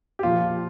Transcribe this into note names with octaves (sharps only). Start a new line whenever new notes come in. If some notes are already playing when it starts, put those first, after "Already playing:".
G4
A#2 F3 F4